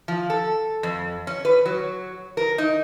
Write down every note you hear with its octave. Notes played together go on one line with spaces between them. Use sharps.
F3
A4
F2
C#4
B4
F#3
A#4
D#4